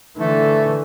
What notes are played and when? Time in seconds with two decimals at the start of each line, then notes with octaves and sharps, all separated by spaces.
0.18 D3 E3 A3